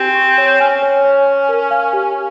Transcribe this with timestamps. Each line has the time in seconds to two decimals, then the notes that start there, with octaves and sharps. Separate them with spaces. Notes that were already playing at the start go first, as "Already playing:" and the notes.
Already playing: C4 G4 G#5
0.15 C#6
0.38 C#5
0.60 C#4 G#5
0.82 C#5
1.05 C#5
1.26 C#6
1.49 A#4
1.71 F5
1.93 G4